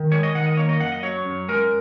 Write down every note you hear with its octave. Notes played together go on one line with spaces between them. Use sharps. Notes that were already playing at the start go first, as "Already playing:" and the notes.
Already playing: D#3
G#3 C#5
D#5
D#3 F#5
D#5
A#3 C#5
D#5
F#2 F#5
D#5
F#3 C#5
F#2
G#3 A#4